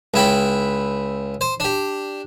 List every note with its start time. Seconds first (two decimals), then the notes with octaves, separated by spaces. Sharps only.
0.14 C#2 E4 G5 B5
1.41 C5
1.60 D4 G4